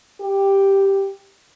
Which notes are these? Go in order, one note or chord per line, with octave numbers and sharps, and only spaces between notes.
G4